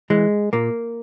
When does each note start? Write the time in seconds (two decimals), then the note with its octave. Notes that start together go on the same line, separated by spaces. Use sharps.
0.10 E3 G#3
0.53 A#2 A#3